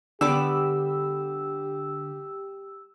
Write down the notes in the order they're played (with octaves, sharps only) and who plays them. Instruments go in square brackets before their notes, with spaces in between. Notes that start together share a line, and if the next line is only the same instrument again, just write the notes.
[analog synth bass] D3 [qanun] G3 B3 D6 [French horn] G4 [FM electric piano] E6